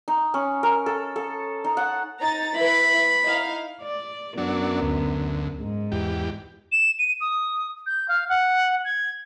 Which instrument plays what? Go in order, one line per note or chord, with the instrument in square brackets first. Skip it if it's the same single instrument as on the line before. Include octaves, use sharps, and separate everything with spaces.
[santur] D#4
C#4
A#4
A4
A4
D#4
F#5
[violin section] D#4 A#5 A6
[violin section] E4 B4 [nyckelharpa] B5
[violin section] D#4 E4 F5
[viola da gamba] D5
[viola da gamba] F#2 B3 [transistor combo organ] F#3 D4
[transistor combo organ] D2
[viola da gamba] G#2
[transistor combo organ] E2 G4
[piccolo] E7
D#7
D#6
G6
F5
F#5
G#6